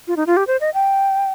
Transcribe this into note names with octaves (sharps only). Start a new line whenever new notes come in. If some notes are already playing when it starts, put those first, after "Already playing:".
F4
D#4
F4
G4
C5
D#5
G5